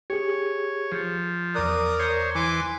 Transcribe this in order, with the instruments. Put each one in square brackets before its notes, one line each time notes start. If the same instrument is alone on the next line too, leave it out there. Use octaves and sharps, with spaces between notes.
[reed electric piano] G4 G#4 [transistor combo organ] C#5
[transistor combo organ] F3
[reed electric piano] E2 F#6 [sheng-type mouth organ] A#4 D5 D#6
[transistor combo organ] C5 C#5
[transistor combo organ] E3 [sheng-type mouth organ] G#5 C6 D6